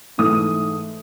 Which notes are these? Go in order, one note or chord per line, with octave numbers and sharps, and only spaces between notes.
G#2 E3 A3 D#6